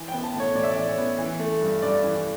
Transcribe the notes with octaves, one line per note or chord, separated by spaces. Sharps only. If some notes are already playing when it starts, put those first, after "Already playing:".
Already playing: E3
G5
B3
A5
A2
C#5
A2 D5
E5
D5
E3
C#5
B3
E3
A3
G2
G2 D5
E3